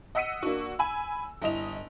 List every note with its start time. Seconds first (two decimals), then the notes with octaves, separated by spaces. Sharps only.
0.15 D#5 F#5 E6 B6 C#7 D#7
0.43 A#3 D4 F#4
0.79 G#5 B5 E6
1.42 G1 E4 D#5 F7